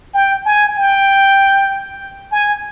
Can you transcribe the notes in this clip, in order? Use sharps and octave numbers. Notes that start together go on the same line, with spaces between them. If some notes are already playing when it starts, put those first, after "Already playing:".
G5
G#5
G5
G#5